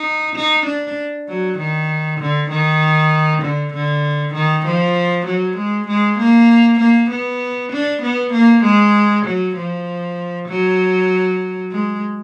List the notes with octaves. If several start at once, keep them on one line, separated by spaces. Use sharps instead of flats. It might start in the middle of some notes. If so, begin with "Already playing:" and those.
Already playing: D#4
D#4
D4
F#3
D#3
D3
D#3
D3
D3
D#3
F3
F#3
G#3
G#3
A#3
A#3
B3
D4
B3
A#3
G#3
F#3
F3
F#3
G#3